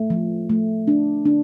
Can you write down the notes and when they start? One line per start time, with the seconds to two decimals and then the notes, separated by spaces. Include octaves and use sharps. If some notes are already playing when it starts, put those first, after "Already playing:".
Already playing: A3
0.10 F3
0.49 A3
0.88 D4
1.25 D4